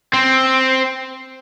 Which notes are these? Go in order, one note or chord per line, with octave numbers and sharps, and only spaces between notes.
C4